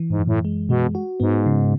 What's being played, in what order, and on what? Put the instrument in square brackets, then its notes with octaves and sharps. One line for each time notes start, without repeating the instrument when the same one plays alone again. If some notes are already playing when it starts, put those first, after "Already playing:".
Already playing: [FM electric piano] E3
[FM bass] G#2
[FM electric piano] F#2
[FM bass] A2
[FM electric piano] G#3
[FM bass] B2 [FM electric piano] G#3
[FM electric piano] F#4
[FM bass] G#2 [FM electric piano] B3
[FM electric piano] C#3